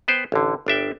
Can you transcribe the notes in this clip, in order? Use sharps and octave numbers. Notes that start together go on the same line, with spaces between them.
B3 B4 C5 G5
A1 D3
G1 D4 E5 G5